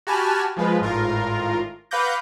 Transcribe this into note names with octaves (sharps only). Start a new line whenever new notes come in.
F#4 G4 G#5 A5 B5 F6
F3 G#3 F4 B4
G#1 A2 F4 A#4
B4 F5 F#5 D6 G6 A#6